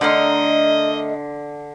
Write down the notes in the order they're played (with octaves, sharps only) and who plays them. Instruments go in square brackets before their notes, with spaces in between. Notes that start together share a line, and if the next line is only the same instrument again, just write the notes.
[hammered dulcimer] D3 C6 [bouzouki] A3 D#4 A#4 [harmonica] D#5